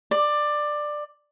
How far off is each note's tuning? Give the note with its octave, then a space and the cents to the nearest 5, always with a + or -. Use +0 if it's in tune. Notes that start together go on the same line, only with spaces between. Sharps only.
D5 +15